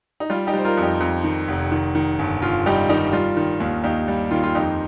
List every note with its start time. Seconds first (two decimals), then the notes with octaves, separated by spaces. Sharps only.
0.20 D#4
0.30 G3 F4
0.47 D#4 G4
0.54 G3 C5
0.65 F4 A#4
0.77 F2
0.83 D#4 G4
1.00 F2
1.24 D#3
1.48 F1
1.72 D#3
1.95 D#3
2.19 G1
2.42 G1 F4
2.66 G3 D#4 G4
2.89 D#3 D#4 G4
3.13 G3 F4
3.37 D#3
3.60 D#2
3.83 D#2 D#4 G4
4.08 G3
4.31 D#3 F4
4.43 F4
4.55 F2 D#4 G4